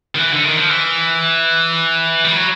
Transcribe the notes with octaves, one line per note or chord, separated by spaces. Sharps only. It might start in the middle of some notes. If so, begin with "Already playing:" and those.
D#3
E3
D3
D#3
F3
E3
G3
F#3